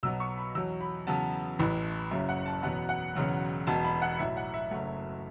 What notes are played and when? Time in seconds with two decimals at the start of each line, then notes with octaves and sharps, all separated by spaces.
0.03 B1 B2 F#3 B3 E6
0.20 C#6
0.37 B5
0.55 E2 B2 F#3 E6
0.81 B5
1.07 E2 C#3 F#3 B3 A5
1.59 A1 A2 E3
2.11 F#1 F#2 C#3 F#3 C#4 E5
2.29 F#5
2.46 A5
2.63 E1 E2 B2 F#3 B3 F#5
2.89 F#5
3.15 E1 E2 C#3 F#3
3.67 E1 E2 B2 B3 A5
3.85 B5
4.02 F#5
4.19 B1 A2 F#3 E5
4.37 F#5
4.54 E5
4.71 F#1 F#2 F#3 A3 C#4